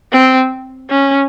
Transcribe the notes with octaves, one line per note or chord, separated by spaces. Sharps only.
C4
C#4